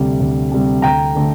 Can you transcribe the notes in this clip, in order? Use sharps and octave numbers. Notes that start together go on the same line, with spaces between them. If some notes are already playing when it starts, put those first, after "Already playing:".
Already playing: D2 C3 G3
D2
C3 G3
D2 G5 A#5
D3 A3